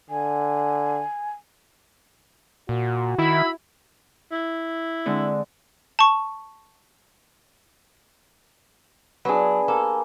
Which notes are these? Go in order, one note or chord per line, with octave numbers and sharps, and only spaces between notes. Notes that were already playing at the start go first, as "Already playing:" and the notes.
D3 G#5
A#2 F#4
D#3 E4 B5
E4
D3 G#3 C4
A5 C#6
F#3 B3 D4 G#4
A#3 A4